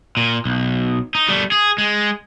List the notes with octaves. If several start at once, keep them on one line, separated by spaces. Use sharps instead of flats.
A#2
B1
D#4
G3 A3
G#4
G#3